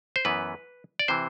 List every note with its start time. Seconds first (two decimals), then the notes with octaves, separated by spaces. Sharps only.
0.16 C5
0.25 F#2 E3 B3 B4
0.99 D5
1.08 C3 E3 C5